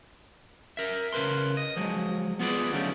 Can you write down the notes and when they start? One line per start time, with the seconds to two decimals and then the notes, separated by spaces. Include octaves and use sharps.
0.77 A#4 E5
1.13 C#3 A#4 B4 C6
1.57 D#5
1.76 F3 F#3 G#3
2.39 B3 F4 G#4 B4 D5
2.72 D3 F3 F#3 A3 C#4 D#4